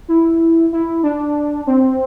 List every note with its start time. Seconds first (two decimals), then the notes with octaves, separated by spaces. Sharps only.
0.08 E4
0.73 E4
1.03 D4
1.67 C4